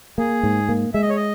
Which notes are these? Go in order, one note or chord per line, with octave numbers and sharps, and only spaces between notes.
A#3 G#4
G#2
A#3
G#3 E5
D#5
C#5
D#5